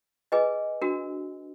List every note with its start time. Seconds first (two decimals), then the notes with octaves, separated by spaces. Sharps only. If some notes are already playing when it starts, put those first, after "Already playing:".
0.32 G#4 B4 D#5 G#5
0.82 D4 F#4 A#4